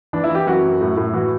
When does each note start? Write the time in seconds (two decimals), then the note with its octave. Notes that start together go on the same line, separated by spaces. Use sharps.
0.13 E3 D4
0.24 E4
0.30 E3
0.35 G4
0.47 F#2 F#4
0.63 F#2
0.81 A2
0.97 A2
1.13 E3 F#4